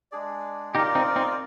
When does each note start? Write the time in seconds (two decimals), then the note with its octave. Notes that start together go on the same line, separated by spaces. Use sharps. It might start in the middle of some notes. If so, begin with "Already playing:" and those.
0.12 G#3 D4 G#4 D5
0.75 D#4 F4 G4 A#4 D5
0.95 C4 D#4
1.16 C4 D#4